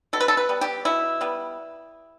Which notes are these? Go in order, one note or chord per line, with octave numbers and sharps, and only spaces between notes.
B2 A4
B4
A4
B4
G3 B3
G4
B2 E4
G3 B3